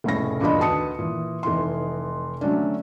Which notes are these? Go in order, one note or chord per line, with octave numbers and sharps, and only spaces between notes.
F1 A2 C#3 A#6
E2 G2 A#2 D4 D#5 B5
D2 D#3 B4 A5 D#6 C#7
A#2 E3
F1 E3 D#4 C6
D3 F#3 A3 C#4 D4